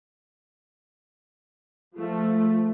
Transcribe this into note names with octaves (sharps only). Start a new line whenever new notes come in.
F3 A3